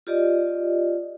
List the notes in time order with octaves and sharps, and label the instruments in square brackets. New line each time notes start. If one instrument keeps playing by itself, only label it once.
[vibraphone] F4 G4 D5 D#5